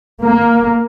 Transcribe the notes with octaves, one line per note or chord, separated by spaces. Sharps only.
A#3